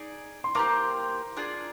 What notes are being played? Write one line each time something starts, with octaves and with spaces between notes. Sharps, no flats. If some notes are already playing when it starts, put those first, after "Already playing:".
Already playing: D#4 G#4 D5
C6
A#3 D4 G4 C5 A#5 D6
D4 F4 G#4 D5